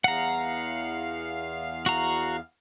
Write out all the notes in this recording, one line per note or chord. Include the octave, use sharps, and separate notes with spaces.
E2 F5 F#5 A#5
F#4 A#5